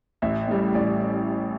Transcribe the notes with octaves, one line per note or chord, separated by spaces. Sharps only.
A1 E5
A2 G3
A1 D5